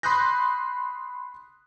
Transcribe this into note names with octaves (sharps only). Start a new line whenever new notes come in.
B5 C6 D#6 F#6 G6 A#6